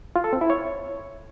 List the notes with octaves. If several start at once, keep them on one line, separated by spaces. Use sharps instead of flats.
F4
A4
C4
E4
C#5